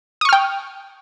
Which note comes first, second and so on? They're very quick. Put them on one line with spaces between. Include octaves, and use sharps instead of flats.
D#6 C#6 F6 G5